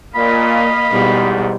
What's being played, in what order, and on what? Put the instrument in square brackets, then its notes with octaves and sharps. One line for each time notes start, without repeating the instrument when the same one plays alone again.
[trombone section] A#2 [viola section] A#3 D#5 F5 [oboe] B5
[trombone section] E2 G#2 [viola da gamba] B2 G3